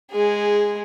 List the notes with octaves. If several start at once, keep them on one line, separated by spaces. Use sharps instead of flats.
G#3 G#4